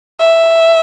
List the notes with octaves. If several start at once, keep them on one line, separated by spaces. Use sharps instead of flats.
E5